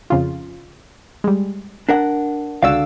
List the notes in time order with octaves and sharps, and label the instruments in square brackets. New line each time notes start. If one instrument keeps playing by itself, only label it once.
[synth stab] F2 C#3 F4
G3 G#3
[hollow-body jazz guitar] D4 A#4 F#5
[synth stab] C#2 F#4 E6 [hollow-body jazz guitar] D3 D5 F5